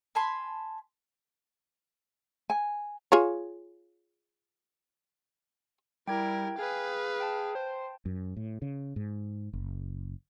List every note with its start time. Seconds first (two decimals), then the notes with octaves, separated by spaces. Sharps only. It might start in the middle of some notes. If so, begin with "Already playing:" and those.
0.15 G#5 A5 B5 C6
2.50 G#5
3.12 F4 G#4 C#5
6.08 G3 E4 A#4 G5 G#6
6.59 G#4 B4 F5
7.20 G5 A5
7.55 C5
8.06 F#2
8.37 A2
8.62 C#3
8.96 G#2
9.53 F#1